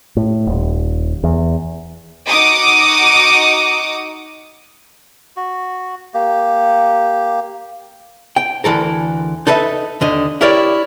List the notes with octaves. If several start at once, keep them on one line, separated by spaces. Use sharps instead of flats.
A2
D#1
E2
D#4 F#4 D6 D#6 C#7
F#4
A#3 G4
G5
D2 E3 A4 A#4
D#4 A4 B4 D#5 E5
D#2 D3 D#5
E4 G4 A#4 C#5 D5 E5